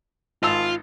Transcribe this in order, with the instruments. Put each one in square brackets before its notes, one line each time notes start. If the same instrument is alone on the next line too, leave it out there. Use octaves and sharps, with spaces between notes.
[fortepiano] G#1 A5 E6 [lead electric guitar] F4